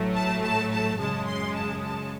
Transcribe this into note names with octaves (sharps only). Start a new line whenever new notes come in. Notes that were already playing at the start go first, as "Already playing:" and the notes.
Already playing: A1 A2 F#3 A3
A5
A5
A5
F#2 C#3 G#3 A5
C6
A5
A5